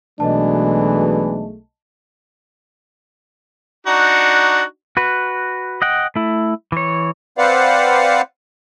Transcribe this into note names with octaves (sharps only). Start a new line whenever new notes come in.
B1 B2 E3 G#3 A3 D4 D#5 A5
D4 D#4 F#4
F#4 B4
D#5 F#5 G5
A3 E4
E3 C#5
C4 B4 C5 D5 F5 F#5